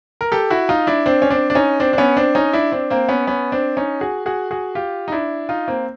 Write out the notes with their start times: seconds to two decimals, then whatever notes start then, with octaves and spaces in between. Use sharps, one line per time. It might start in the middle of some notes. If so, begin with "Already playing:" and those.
0.21 A#4
0.32 G4 A4
0.50 E4 F#4
0.69 D#4 F4
0.87 D4 E4
1.06 C4 D4
1.22 C#4
1.30 C4 D4
1.50 D4
1.55 C#4 D#4
1.80 C4 D4
1.93 D4
1.98 B3 C#4
2.17 C4 D4
2.35 C#4 D#4
2.53 D4 E4
2.72 C4 D4
2.90 A#3 C4
3.09 B3 C#4
3.27 B3 C#4
3.52 C4 D4
3.77 C#4 D#4
4.01 F#4 G#4
4.26 F#4 G#4
4.51 F#4 G#4
4.75 F4 G4
5.08 D#4
5.12 D4 E4
5.49 D#4 F4
5.68 A#3 C4